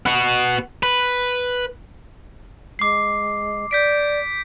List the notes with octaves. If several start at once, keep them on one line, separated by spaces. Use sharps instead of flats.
B3 F#4
B4
G#3 D6 C7
D5 G6 B6 D7